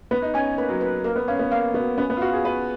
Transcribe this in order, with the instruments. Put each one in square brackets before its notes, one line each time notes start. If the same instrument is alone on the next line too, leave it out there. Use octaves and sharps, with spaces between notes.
[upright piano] B3 [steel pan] B4
[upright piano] D#4
[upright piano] C#4 [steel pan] G#5
[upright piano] A#3 [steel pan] B4
[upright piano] F#3
[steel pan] B4
[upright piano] A#3 [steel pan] A#4
[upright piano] B3
[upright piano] C#4 [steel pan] F5
[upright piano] B3
[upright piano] A#3 [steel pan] F5
[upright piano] B3 [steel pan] F#4
[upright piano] B3 [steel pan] C#4
[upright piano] B3
F4
[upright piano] F#4 [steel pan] F5
[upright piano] G#4
[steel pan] F#4 [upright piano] B4